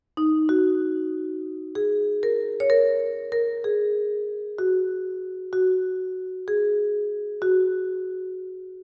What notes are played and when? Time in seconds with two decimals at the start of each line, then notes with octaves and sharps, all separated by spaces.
0.17 D#4
0.49 F#4
1.75 G#4
2.23 A#4
2.60 C#5
2.70 A#4
3.32 A#4
3.64 G#4
4.59 F#4
5.53 F#4
6.48 G#4
7.42 F#4